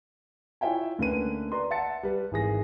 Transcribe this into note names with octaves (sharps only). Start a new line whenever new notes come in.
E4 F4 C#5 E5 G5 G#5
D2 D3 A#3 C#4 B4 D#7
B4 D5 A#5 C6
E5 F#5 A5 A6 C#7
G3 B4
G#1 E3 G#4 A#6